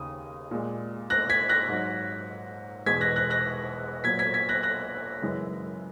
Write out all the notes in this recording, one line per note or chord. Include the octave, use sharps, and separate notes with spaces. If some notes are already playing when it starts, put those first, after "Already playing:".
Already playing: D#2 C#3 D#6
A#2 G#3
F#6 A#6
G#6 B6
F#6 A#6
G#2 F#3
E2 B2 G#3 G#6 B6
F#6 A#6
F#6 A#6
F#6 A#6
A#2 F#3 G#6 B6
G#6 B6
G#6 B6
F#6 A#6
F#6 A#6
F#2 C#3 E3 G#3